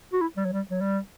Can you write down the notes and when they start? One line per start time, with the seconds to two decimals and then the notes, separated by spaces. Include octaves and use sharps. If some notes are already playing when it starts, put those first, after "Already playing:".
0.13 F#4
0.21 E4
0.37 G3
0.45 F#3
0.53 G3
0.71 F#3
0.81 G3